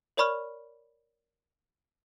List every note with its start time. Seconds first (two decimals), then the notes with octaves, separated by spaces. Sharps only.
0.17 A#4 C#5 D5 B5 C#6 F6